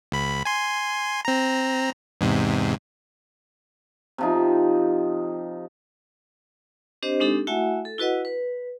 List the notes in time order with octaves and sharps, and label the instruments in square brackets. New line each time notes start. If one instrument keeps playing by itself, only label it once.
[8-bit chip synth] C#2 B5
G#5 C6
C4 A#5
E2 G#2 C3
[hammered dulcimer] C3 F3 D#4
[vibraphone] C4 D4 G4 C5 D#5
G#3 C4 D4 D#4 G4 A4
A3 E4 F#4 E5 F#5 G#5
A4
E4 F#4 B4 D#5 F#5
B4